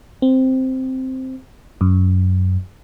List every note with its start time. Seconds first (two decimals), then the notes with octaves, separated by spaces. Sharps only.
0.22 C4
1.81 F#2